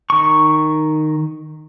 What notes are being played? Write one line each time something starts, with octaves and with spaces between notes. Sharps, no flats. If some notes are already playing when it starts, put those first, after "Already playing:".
D#3 C#6